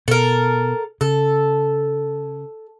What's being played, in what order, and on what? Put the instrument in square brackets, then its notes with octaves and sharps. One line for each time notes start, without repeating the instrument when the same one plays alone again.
[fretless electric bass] B2 [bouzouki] A4 A#4
[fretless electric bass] C#3 [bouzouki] A4